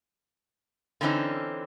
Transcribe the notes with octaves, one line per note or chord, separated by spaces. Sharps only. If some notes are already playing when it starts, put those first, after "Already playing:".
D3 E3 C4 C#4 D#4